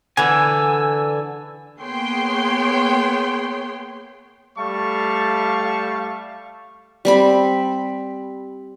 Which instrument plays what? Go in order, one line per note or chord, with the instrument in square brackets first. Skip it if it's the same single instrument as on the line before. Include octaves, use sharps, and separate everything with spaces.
[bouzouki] D3 E3 [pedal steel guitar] G#5 [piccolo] E6
[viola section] A#3 B3 G#4 C#5 G5 C6
[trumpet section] G3 A3 F5 A5 C#6
[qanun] G3 C4 B5